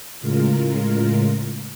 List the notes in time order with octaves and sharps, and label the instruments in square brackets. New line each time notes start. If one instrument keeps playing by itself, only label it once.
[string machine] A2 C#3 G#3 F4 A#4